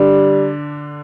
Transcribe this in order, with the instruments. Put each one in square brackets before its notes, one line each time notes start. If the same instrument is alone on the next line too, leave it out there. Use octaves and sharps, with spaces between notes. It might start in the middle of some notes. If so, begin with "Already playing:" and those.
Already playing: [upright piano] D3 D4 [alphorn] G3